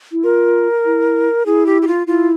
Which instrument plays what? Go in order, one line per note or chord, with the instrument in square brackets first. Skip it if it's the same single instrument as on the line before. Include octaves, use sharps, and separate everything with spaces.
[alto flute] E4
[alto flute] F4 [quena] A#4
[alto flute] E4
[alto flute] E4 [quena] G#4
[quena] G4
G4
F4
[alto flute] E4 [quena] F4